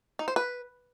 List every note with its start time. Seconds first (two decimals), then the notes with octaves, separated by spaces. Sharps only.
0.19 D#4
0.28 C5
0.36 B4